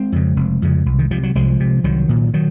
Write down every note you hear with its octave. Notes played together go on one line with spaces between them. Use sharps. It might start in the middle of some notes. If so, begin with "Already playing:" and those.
Already playing: G#3 C4
F2 C#3
F1
F2 C#3
C2
D#3
C3 F3
F#3
C2 F3 G#3
C3
C2 D#3 F#3
A#2
D#3 F#3